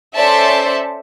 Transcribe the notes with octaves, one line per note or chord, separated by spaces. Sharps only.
C#4 A4 C5 D5 E5 A5